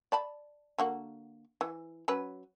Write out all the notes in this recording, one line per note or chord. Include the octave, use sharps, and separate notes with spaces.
D5 A5 B5
D3 A#3 F#4
E3
F#3 C#4 B4